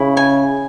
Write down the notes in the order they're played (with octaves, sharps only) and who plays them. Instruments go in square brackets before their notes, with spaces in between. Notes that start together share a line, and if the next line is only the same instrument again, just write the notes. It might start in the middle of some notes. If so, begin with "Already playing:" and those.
Already playing: [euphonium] C#3 [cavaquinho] E4
[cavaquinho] G#5